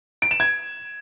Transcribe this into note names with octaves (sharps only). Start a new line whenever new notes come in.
D7
E7
G#6